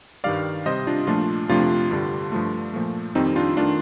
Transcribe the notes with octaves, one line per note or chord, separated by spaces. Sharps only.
G2 D#3 G3 D5 F5
C3 G3 C5 D#5
D4 F4
A#2 F3 A3 D4 F4
F2 C3 F3 A3 D4 F4
G2 D3 G3
G2 F3 A3
A#2 F3 A3
F2 D#3 G3 C4 D#4
D4 F4
D#3 A3 D4 F4